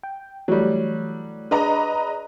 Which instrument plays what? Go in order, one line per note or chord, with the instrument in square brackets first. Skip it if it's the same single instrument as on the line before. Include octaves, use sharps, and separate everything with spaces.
[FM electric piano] G5
[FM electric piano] E3 A3 [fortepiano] F#3 G3
[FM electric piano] D4 G#4 D5 [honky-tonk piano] B4 D#5 A#5